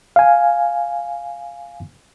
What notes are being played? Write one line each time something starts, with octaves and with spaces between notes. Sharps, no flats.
F5 G#5